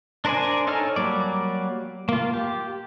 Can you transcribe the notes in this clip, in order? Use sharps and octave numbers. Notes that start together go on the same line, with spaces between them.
D4 A#4 C5 D5 G#5
D#4 A4 C#5 G#5 F6
F#3 G3 A#3 D5
A#3 F4
G4